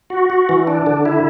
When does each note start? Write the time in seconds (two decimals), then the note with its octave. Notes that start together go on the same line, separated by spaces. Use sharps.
0.10 F#4
0.30 F#4
0.49 E3
0.67 D4
0.86 D3
1.05 E4